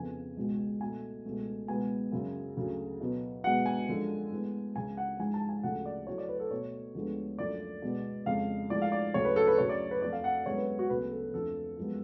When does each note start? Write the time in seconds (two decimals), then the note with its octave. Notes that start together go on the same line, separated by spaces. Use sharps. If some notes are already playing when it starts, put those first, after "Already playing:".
Already playing: F2 C#3 F3 B3 G#5
0.37 C#2 B2 G#3
0.81 B2 A3 G#5
1.25 C#2 B2 A3
1.68 C#2 B2 G#3 B3 G#5
2.12 F#2 C#3 F#3
2.56 D2 C#3 F#3
3.01 B2 F#3 B3
3.44 B2 G#3 B3 F#5
3.66 G#5
3.88 F#2 D3 F3 G#3
4.32 A2 G#3 B3
4.75 C#2 C#3 G#3 G#5
4.97 F#5
5.19 G#2 F3 G#3 G#5
5.34 A5
5.49 G#5
5.63 D2 C#3 F3 A3 F#5
5.86 D5
6.07 A2 F#3 A3 C#5
6.18 D5
6.29 B4
6.40 A4
6.50 B2 A3 C#5
6.95 D2 D3 F3 G#3 B3
7.39 F#2 D3 F3 A3 D5
7.82 B2 G#3 B3
8.26 F2 C#3 G#3 F5
8.70 A2 F3 G#3 D5
8.82 F5
8.92 D5
9.14 D2 C#3 F#3 A3 C#5
9.25 B4
9.36 A4
9.47 B4
9.58 F#2 C#3 F#3 A3 C#5
9.69 D5
9.91 B4
10.01 F2 F3 A3 D5
10.13 F5
10.24 F#5
10.46 F#2 D3 G#3 B3 C#5
10.57 B4
10.79 F#4
10.90 D2 C#3 F#3 B3 B4
11.11 A4
11.33 F2 D3 F3 A3 A4
11.77 F#2 F3 G#3 B3